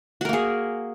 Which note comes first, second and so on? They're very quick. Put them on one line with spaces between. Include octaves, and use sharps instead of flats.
F#4 A#4 A#3 G#4